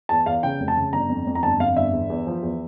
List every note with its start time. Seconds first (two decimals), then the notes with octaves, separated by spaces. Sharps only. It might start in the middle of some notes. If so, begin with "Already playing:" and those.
0.09 E2 A5
0.26 E2 F5
0.43 C#3 G5
0.60 F1
0.68 A5
0.77 C#3
0.93 G1 A#5
1.09 F2
1.27 F2
1.35 A#5
1.43 G1 A5
1.60 F2 F5
1.76 G1 E5
1.93 E2
2.10 E2
2.27 F3
2.42 E2